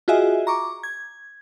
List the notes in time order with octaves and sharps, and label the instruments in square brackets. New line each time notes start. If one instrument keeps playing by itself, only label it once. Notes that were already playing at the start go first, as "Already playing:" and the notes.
[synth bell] F4 F#4 G#4 D#5 E5 G#5
A#5 C#6 D6
G#6